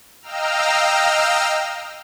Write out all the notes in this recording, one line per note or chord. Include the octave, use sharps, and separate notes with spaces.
D#5 F5 G5 A#5 E6 F6